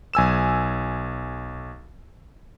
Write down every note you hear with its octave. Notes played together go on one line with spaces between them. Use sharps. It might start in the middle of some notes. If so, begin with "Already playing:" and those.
B1 G#5 E6 E7